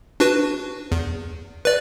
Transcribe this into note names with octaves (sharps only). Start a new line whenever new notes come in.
D4 F#4 B4
E2
B4 D5